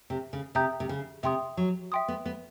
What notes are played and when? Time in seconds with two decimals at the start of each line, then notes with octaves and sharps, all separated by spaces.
0.10 C3
0.33 C#3
0.55 C3 E5 G5 A#5 D#6 G6
0.80 C3
0.89 C#3
1.23 C3 E5 G5 C6 D#6
1.57 F#3
1.92 E5 G5 C6 D#6
2.08 B3
2.26 B3